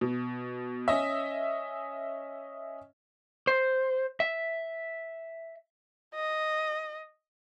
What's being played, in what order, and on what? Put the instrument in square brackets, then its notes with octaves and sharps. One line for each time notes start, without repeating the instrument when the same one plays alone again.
[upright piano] B2
C#4 D#5 E5
[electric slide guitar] C5
E5
[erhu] D#5